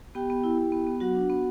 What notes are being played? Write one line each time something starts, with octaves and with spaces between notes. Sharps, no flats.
B3 G4 G5
B3
E4
E4
B3
B3
F#3 F#4 F#5
D4
B3